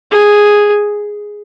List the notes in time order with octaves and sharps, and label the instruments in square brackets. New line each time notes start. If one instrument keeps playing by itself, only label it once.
[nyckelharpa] G#4